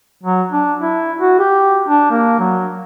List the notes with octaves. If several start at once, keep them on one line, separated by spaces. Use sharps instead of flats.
F#3
D4
E4
F#4
G4
D4
A#3
F#3